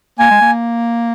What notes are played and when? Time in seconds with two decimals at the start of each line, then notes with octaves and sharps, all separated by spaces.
0.19 A#3 G#5
0.31 G#3
0.41 A#3